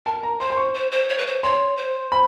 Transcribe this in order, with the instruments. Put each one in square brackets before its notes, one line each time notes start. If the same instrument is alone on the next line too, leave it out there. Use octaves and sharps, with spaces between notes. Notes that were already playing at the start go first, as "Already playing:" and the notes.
[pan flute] A#4 [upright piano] A5
[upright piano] A#5
[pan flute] C5 [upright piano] C6
[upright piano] C6
C#6
[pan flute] C5
C5
C#5
B4
C5
[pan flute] C#5 [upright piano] C6
[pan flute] C5
[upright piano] B5